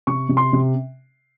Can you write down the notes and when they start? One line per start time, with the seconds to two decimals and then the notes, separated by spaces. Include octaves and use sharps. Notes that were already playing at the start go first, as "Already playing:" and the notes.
0.07 C3 C#6
0.29 C3
0.37 C6
0.53 C3